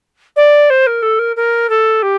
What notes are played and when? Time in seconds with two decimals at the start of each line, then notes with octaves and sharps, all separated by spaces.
0.36 D5
0.70 C5
0.87 A#4
1.02 A4
1.19 A#4
1.36 A#4
1.69 A4
2.02 G4